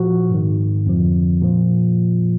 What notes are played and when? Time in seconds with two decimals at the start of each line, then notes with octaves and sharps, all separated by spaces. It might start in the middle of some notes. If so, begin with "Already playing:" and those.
Already playing: A#2 F3 F#4
0.30 G#2 D#3
0.86 F2 D3 F3
1.42 A#2 F3